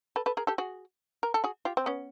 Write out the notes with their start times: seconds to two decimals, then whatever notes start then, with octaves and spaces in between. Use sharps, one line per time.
0.16 A4 B4
0.26 A4 B4
0.37 G#4 A#4
0.47 G4 A4
0.58 F#4 G#4
1.23 A#4
1.34 A4
1.44 F#4 G#4
1.65 F4 G4
1.77 C4
1.86 B3 C#4